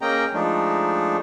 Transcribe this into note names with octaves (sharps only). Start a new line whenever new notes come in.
A#3 C#4 G#4 D#5 G5 A#5
F3 G#3 A3 D4 D#4